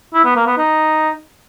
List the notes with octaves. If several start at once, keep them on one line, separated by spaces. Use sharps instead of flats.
E4
B3
A#3
B3
D#4